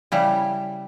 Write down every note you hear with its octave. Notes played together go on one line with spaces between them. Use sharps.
C#3 G3 E4